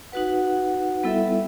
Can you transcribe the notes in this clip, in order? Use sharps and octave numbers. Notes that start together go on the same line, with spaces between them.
D#4 F#4 B4 F#5
G3 B3 E4 A4 E5